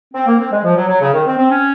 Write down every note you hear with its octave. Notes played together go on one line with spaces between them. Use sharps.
C4
A#3
C4
G#3
F3
F#3
F#3
C#3
D#3
C4
C4
C#4